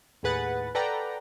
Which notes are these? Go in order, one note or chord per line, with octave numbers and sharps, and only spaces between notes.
D#2 A2 G#4 B4 F#5 A6
A4 B4 D5 F#5 G5 A#5